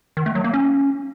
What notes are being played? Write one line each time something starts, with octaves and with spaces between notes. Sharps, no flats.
D#3
A3
F#3
A#3
C#4